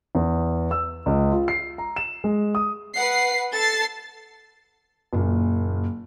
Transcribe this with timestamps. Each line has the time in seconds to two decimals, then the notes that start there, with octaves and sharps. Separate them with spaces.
0.15 E2
0.71 E6
1.06 C#2
1.32 F4
1.48 C7
1.78 A#5
1.96 E7
2.24 G#3
2.55 D#6
2.96 B4 F#5 C7
3.53 A4 A6 C7
5.13 F#1 A#2